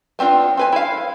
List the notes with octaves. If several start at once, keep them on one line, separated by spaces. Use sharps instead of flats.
B3 C4 D4 F4
C4 B4 G#5
E4 F5